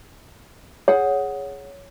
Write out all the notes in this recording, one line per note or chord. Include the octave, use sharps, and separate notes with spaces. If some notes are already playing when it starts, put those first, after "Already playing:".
G#4 C#5 F#5